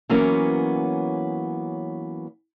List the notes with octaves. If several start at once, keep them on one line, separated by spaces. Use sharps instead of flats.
E3 F#3 A#3 B3 C#4